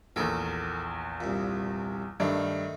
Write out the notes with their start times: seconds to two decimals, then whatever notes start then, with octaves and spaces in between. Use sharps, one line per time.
0.16 A#1 E2 A4 A#4
1.21 C2 A#2
2.20 G2 D#3 A3 D4 D#4